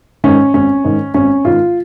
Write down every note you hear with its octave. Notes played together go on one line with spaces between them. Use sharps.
G#2 D#3 C#4
G#1 C#4
G#2 D#3
G#1 C#4
G#2 D#3 F4